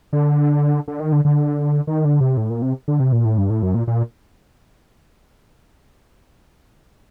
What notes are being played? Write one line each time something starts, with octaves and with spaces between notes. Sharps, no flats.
D3
D3
D#3
D3
D3
D#3
D3
C3
A2
A#2
C3
D3
C3
A#2
A2
G2
A2
F#2
A#2
A#2